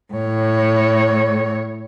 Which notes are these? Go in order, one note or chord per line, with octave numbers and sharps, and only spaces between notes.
A2 C#5